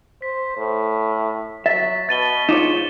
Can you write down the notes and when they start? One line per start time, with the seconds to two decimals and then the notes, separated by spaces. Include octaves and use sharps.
0.22 C5 B6
0.57 A2
1.66 F#3 E5 A6 B6
2.09 B2 A6 D#7 G7
2.49 G#2 D#4 F4 C#5 D6 E7